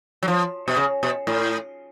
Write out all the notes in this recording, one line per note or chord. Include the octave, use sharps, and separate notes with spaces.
F#3
F3
B2
C#3
B2
A2